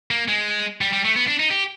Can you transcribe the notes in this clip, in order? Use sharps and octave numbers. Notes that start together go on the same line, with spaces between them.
A#3
G#3
G3
G3
A3
B3
D4
D#4
G4